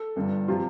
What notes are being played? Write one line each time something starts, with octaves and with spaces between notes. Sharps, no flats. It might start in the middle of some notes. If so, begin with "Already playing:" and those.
Already playing: A4
G1 G2 D3
C3 F3 F4